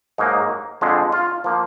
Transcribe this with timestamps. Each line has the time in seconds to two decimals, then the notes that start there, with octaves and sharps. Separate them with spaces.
0.18 G#2 F#3 A#3 D#4
0.81 F2 D3 F3 G#3
1.12 F4
1.44 F3 A#3